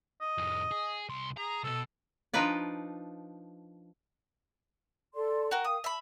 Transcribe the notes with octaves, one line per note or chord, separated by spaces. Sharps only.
D#5
F2 A2
G#4
C2 C6
G#4 A#5
C2 B2 A4
F3 D4 D#4 F4 B4 D5
A4 D5 C6
F#4 A#4 G5
A#4 F5 G5 D#6
E5 A5 B5